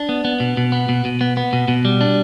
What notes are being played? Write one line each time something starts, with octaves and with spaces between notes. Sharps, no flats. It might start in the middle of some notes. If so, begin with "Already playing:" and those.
Already playing: D4
B3
B3
B2
B2
B3
B2
B2
B3
B3
B2
B2
G3
D4